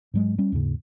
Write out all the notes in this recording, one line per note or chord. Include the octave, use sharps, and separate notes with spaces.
G#2 F#3 G#3
G3 C#4
D#2 G#2 C#3